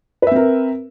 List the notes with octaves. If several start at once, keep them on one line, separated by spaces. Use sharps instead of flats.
C4 A#4 B4 E5